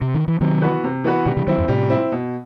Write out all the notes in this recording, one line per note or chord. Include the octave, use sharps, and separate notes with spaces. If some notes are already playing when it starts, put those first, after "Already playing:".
C3
D#3
E3
C3 D#3 F#3
E3 B3 F#4 B4
C3
E3 B3 F#4 B4
B2 D#3 G3
C3 E3
D#3 F#3 C4 E4
E2 G2
A2 C3 G3
C4 E4
B2